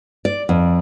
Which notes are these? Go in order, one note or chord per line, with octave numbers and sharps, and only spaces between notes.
D5
F2